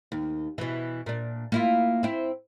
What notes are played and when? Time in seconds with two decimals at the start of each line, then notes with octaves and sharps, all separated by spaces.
0.12 D#2
0.58 B2 E3
1.06 A#2 D4
1.52 A#3 E4 F4
2.03 C4 E4